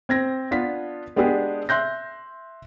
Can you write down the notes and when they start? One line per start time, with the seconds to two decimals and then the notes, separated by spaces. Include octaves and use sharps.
0.09 C4 G#6 A#6
0.51 B3 D4 F4 B6
1.16 G#3 B3 D4 G4 G#4
1.69 E5 C6 F#6 G6 A#6